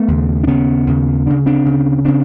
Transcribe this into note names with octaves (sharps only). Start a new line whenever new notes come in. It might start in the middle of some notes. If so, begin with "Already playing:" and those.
Already playing: A3 B3
D#2 C#3
D4
D#2 C#3 B3 C#4
D#2 C#3
D2 C#3 D4
C4 D4
D2 C#3
C#3 C4 D4